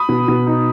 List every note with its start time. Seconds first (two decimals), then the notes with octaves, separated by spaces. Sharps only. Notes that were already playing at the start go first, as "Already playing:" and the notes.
Already playing: B5 D#6
0.09 B2
0.28 B2
0.46 D#4